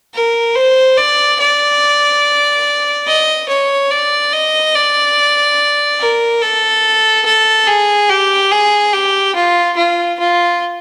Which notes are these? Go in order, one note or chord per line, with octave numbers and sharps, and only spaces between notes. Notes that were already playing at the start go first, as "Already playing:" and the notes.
A#4
C5
D5
D5
D#5
C#5
D5
D#5
D5
A#4
A4
A4
G#4
G4
G#4
G4
F4
F4
F4